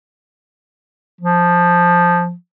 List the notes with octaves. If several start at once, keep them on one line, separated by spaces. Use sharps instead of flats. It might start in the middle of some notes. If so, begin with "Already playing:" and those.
F3